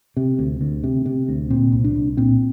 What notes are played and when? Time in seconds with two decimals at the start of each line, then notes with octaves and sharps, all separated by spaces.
0.17 C3
0.39 D2
0.61 D2
0.83 C3
1.06 C3
1.29 D2
1.50 A#2 C4
1.72 C2
1.84 D4
1.96 C2
2.17 A#2 C4